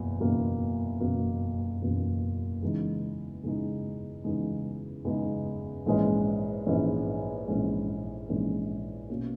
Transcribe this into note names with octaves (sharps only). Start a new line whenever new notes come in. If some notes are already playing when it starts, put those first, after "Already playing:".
Already playing: F#1 E2 B2 A#3
F#1 E2 B2 A#3
F#1 E2 B2 A#3
F#1 E2 B2 A#3
E2 C#3 E3 G#3 D#4
E2 C#3 E3 G#3 D#4
E2 C#3 E3 G#3 D#4
E2 C#3 E3 G#3 D#4
A#1 G#2 E3 G#3 C#4
A#1 G#2 E3 G#3 C#4
A#1 G#2 E3 G#3 C#4
A#1 G#2 E3 G#3 C#4
B2 A#3 C#4